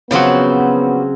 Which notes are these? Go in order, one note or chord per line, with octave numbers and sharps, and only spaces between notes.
C#3 F3 F#3 B3 C4 F#4